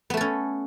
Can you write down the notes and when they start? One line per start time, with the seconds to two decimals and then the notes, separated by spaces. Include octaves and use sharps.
0.10 B3
0.14 A3
0.17 A4
0.21 C#4